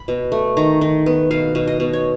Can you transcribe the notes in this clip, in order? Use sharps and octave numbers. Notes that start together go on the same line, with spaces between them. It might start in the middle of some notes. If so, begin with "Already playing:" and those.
Already playing: B5
B2
A3
D#3 A#5
D#3
B3
B2 F5
B2
D#5
B2
C#5